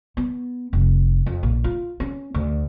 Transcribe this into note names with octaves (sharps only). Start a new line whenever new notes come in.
B3
F1
F2
A#1
F4
C#4
D2